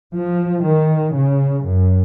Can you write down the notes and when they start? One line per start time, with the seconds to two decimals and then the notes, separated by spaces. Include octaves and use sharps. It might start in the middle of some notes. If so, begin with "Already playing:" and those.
0.16 F3
0.66 D#3
1.16 C#3
1.67 F#2